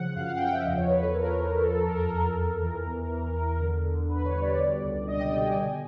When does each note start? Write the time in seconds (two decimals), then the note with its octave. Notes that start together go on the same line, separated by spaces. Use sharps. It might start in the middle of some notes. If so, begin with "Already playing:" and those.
Already playing: C#3 F3 F#5
0.16 F#2 F5
0.28 F#5
0.36 G5
0.40 F3 F#5
0.52 E5
0.64 E2 D#5
0.77 C#5
0.89 E2 B4
1.02 A4
1.14 E2 A#4
1.39 E2
1.63 F3 A4
1.79 A#4
1.88 F2 A4
1.96 A#4
2.04 A4
2.12 F2 A#4
2.37 F2
2.61 E3 A#4
2.86 E2
3.10 E3
3.36 E2
3.60 D3
3.84 D3
4.09 D3 B4
4.25 C#5
4.34 G3
4.42 D5
4.58 B2
4.83 C#2
5.07 G3 D#5
5.20 G5
5.32 B2 G5
5.44 G#5
5.56 B2 G#5